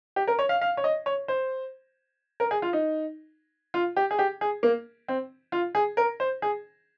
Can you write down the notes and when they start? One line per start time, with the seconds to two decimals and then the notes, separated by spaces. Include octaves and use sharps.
0.16 G4
0.27 A#4
0.39 C#5
0.49 F5
0.61 F5
0.77 C#5
0.84 D#5
1.06 C#5
1.28 C5
2.40 A#4
2.51 G#4
2.62 F4
2.73 D#4
3.74 F4
3.96 G4
4.11 G#4
4.19 G4
4.41 G#4
4.63 A#3
5.08 C4
5.52 F4
5.75 G#4
5.97 A#4
6.20 C5
6.42 G#4